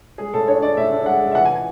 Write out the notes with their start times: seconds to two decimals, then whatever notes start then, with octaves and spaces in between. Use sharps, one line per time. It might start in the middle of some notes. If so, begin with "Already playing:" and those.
0.18 G#3 G#4
0.34 A2 A4
0.48 D4 C#5
0.62 D4 D5
0.77 A2 E5
0.92 D4
1.06 G#3 F#5
1.21 G#3
1.32 E5
1.35 E3 F#5
1.45 G#5
1.50 E3
1.55 G#5